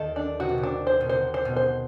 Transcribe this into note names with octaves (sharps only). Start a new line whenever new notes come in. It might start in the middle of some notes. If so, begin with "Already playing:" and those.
Already playing: D#2 D#3 A4
D4
C3 F#4
B2
C3
D4
C5
B2
C3 C5
C5
B2
C5